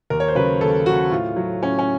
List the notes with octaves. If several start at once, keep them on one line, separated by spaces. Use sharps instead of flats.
D#2 A#4
C#5
C5
C#3 F#3 B4
D#2 A4
C#3 F#3 F#4
A2 F4
F#3
A2 C#4
C#4